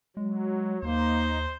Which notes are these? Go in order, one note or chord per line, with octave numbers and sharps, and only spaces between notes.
F#3 G#3
D#2 A#3 D#4 C5